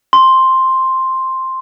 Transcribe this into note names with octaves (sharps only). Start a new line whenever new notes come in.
C6